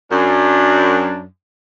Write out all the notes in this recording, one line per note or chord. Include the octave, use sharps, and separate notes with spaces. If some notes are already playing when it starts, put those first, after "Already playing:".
F#2 D4